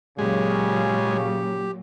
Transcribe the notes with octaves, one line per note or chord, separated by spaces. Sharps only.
A#2 C#3 F#3 G#3 G4